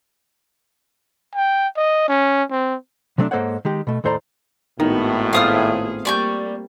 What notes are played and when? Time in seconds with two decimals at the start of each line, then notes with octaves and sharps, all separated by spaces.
1.35 G5
1.77 D#5
2.08 C#4
2.50 C4
3.18 C3 F#3 A3 C4 D4
3.31 G#2 A#3 A4 C5 C#5 F#5
3.65 D#3 G#3 G4
3.87 B2 A3
4.04 D#2 A2 A4 C5 D5 A#5
4.80 G#1 A2 D#3 B3 F#4
5.33 A3 B3 C4 F4 G#4 F5 D#6 F6
6.05 G3 A#3 D5 C#6 G6